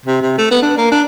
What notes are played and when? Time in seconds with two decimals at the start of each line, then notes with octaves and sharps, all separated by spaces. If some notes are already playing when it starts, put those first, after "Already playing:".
0.06 C3
0.22 C3
0.38 A3
0.51 B3
0.62 D4
0.78 A#3
0.92 D4